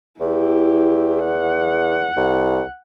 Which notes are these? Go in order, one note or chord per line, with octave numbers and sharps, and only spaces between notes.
E2 E4 G4
F#5
C2